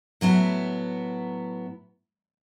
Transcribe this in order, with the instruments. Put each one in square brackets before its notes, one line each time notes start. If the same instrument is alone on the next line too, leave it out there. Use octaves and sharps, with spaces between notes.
[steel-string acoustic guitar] A2 F#3 B3 E4